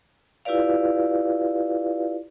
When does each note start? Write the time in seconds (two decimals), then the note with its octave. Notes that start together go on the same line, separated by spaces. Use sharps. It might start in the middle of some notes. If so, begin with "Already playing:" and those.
0.45 E4 F4 G4 B4 D5 F5